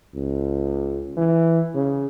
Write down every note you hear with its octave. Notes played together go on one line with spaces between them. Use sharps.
C#2
E3
C#3